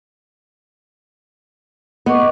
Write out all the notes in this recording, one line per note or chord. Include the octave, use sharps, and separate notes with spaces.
B3 D#5 C#6 D6